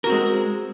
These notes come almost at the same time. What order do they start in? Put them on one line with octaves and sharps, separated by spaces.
A#4 F#4 C4 G#3